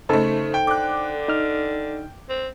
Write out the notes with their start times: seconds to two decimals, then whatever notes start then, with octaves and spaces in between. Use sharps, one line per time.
0.09 C#3 A3 D#4 A4 C5
0.54 G5
0.67 D3 D6 F#6
1.28 D#4 F6
2.29 C4